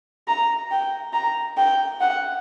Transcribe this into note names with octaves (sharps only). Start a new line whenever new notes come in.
A#5
G5
A#5
G5
F#5